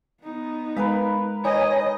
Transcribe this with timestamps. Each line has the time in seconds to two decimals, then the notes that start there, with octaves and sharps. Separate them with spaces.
0.24 B3 D#4
0.77 G#3 A#4 B4 F5
1.45 D#4 C#5 D#5 G#5